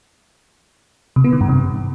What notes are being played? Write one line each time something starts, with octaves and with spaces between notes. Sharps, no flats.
C3
B3
D#3
G2
C3